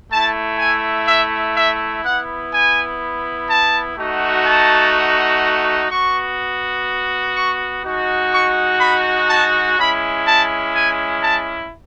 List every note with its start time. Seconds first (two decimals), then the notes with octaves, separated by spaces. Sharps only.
0.11 A3 E4 A5
0.59 G#5
1.07 E5
1.56 E5
2.04 B3 E4 F#5
2.53 G#5
3.50 A5
3.97 A3 D#4 F#4
4.45 A5
5.90 B3 F#4 C#6
7.36 C#6
7.84 G#3 D#4 F#4
8.33 C#6
8.80 B5
9.28 A5
9.78 G#3 C#4 E4 B5
10.26 A5
10.75 G#5
11.22 A5